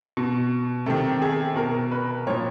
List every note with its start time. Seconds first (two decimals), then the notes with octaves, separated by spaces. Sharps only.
0.17 B2
0.86 C3 D#3 A4
1.22 G#4
1.56 B2 A#4
1.91 B4
2.27 A#2 C#5
2.29 F3